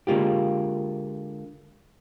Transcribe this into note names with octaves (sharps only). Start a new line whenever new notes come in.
D3 G#3 A#3 F4 G4